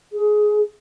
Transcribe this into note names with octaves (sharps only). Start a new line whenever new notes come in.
G#4